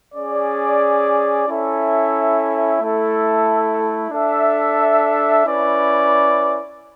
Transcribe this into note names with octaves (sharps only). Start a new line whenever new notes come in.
C#4 G#4 D5
C#4 E4 A4 E5
A3 E4 A4
D4 A4 E5
C#4 E4 B4 D5